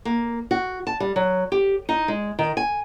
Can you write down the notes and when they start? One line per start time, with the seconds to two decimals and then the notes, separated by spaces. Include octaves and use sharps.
0.05 A#3
0.51 F#4
0.87 A5
1.00 G3
1.16 F#3
1.52 G4
1.89 D#4
2.08 G#3
2.39 D#3
2.57 G#5